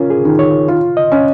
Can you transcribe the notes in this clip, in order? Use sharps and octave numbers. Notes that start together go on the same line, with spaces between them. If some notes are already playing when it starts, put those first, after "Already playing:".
Already playing: C#4 F4 A#4
G#4
D#3
C#5
F4
D#5
C#4